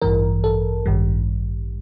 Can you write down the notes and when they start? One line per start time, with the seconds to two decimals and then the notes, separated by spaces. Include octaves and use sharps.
0.02 A1 G2 E3 A#4
0.44 A4
0.86 A1 G2 D#3 G3